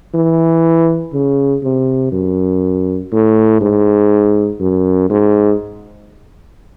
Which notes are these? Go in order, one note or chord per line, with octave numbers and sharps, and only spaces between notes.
E3
C#3
C3
F#2
A2
G#2
F#2
G#2